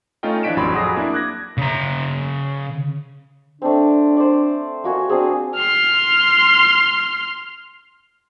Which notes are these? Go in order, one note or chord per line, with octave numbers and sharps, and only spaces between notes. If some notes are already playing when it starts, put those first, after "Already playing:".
A3 C#4 D#4 F4 D#5 G5
E3 F3 D4 B6 D7 E7
A1 F2 F#3 D5 B5 C6
F2 F#3 G#4 D#6 A#6
A#3 D4 E4
D6 F#6 G#6 A#6
C#3 A#5
A3 C4 D4
C5 D5
A#3 F#4 G#5
C4 D4 G#4 C5
C6 F6